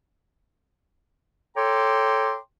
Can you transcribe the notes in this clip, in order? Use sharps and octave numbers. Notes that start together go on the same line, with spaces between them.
A4 C#5 G5 A#5 C6 D6